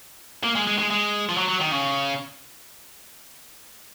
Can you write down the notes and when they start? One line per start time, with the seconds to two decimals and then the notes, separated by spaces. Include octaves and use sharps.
0.43 A#3
0.55 G#3
0.67 G#3
0.79 G#3
0.90 G#3
1.29 F3
1.37 F#3
1.48 F#3
1.60 D#3
1.72 C#3